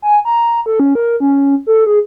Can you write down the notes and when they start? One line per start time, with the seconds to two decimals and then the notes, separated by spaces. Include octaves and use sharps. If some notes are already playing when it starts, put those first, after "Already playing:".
0.02 G#5
0.25 A#5
0.66 A4
0.80 C#4
0.95 A#4
1.20 C#4
1.67 A4
1.86 G#4